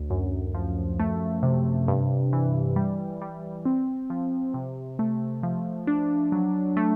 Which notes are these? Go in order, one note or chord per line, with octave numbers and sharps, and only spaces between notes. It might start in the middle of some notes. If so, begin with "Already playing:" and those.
Already playing: D2
F#2
F3
A3
C3
G2
E3
G3
G3
C4
F3
C3
A3
F3
D4
F#3
A3